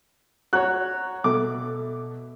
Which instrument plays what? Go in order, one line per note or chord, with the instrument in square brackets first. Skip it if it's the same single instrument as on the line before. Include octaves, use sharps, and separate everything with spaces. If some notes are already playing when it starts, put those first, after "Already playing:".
[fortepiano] F#4 C#5 [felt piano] A#5 C#6 F#6
[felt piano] B2 A4 E5 [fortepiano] D6